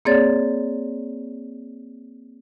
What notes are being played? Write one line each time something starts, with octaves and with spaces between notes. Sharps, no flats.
A#3 C4 G#4 C#5 D5 A6